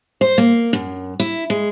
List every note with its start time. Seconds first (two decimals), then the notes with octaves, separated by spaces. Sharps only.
0.21 C5
0.38 A#3
0.73 F#2
1.20 E4
1.50 G#3